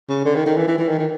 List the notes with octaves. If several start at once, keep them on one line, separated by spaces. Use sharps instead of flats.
C#3
D3
D#3
D#3
E3
E3
E3
D#3
D#3